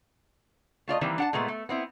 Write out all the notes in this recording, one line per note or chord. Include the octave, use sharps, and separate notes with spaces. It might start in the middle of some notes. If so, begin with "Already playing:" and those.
A3 F4 D5 D#5
D#3 E3 G3 A#3 C4
D4 F#5 A5
A#2 G#3 A3 B3
A3
B3 C4 E4